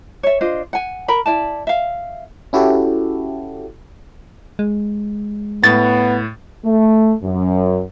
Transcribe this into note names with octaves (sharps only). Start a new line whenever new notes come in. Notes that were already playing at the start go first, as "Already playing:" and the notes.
C#5 E5
D4 F4 C5 D#5
F#5 G#5
A#4 A#5 B5
E4 D5 A5
E5 F5
C#4 E4 F#4 G4 A4
G#3
A2 B3 A6
A3
F#2